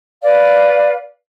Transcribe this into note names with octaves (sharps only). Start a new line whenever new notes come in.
B4 D5 F5